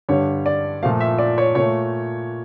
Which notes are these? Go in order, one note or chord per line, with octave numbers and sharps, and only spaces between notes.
G2 D3 G3 C#5
D5
A#2 F3 A3 F5
E5
D5
C#5
A#2 A3 C#5